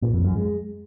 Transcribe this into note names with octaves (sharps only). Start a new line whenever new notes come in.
A#2
F2
F#2
G#3